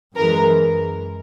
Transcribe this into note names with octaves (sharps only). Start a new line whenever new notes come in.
F#2 E3 G#3 A#4